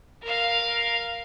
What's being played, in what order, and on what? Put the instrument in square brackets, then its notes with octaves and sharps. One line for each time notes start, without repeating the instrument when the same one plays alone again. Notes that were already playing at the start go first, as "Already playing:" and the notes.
[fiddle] A#4 F5